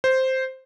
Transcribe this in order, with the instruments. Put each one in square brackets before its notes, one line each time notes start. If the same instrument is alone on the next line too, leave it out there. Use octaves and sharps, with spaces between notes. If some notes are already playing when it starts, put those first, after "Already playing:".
[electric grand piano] C5